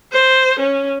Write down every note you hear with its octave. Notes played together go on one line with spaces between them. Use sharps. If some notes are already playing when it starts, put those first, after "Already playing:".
C5
C#4